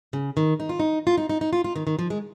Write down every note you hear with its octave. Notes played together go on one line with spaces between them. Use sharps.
C#3
D#3
D#4
F4
D#4
F4
D#4
D#4
D#4
F4
F4
D#3
D#3
F3
G#3